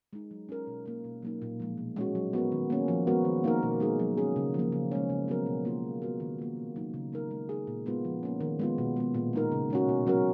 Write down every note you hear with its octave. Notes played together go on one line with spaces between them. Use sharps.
G#3 D#4
F#3
C#4 F4 A#4
B2
A#3 F4 A#4
B2
F#3 A#3 D#4
A#2
F3 G#3
B2
G#3 C#4 F#4
F#3
B3 F#4 A#4
D#3
A#3 C#4
F3
G#3 B3 F#4 A#4
D#3
A#3 D#4 A#4
B2
G#3 D#4 G#4
F#3
C#4 G#4
C#3
F3 A#3
C#3
G#3 C#4
C#3
F#3 B3 F#4 A#4
B2
A#3 F4 G#4
F3
G#3 B3 F#4 A#4
D#3
A#3 F4
A#2
F#3 A#3 D#4
C#3
G#3 D#4 A#4
G#3
D#4 G#4
A#2
G#3 B3 F4
F3
A#3 C#4
D#3
G#3 B3 F4
B2
G#3 B3
A#2
G#3 D#4 A#4
C#3
G#3 C#4 F#4
B2
F#3 C#4 F#4 A#4